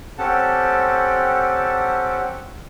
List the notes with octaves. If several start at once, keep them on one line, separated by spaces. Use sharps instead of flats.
C4 C#4 G4 A4 F#5 A5